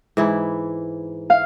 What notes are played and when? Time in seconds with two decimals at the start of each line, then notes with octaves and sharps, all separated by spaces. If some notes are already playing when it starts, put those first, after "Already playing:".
0.17 G#2 E3 E4
1.30 F5